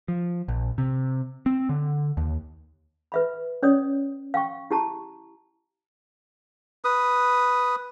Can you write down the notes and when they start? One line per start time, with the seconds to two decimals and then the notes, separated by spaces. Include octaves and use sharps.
0.08 F3
0.48 A#1
0.78 C3
1.46 C4
1.69 D3
2.17 D#2
3.12 B4 E5 B5
3.63 C#4 C#5 D5 D#6
4.34 F5 G5 C#6
4.71 E4 G4 A5 A#5 C#6
6.85 B4 D#6